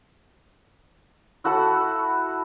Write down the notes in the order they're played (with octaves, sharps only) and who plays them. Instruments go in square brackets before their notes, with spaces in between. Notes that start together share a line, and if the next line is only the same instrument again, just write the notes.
[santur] E4 F#4 A4 B5